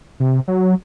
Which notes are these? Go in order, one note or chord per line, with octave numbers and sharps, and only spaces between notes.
C3
F#3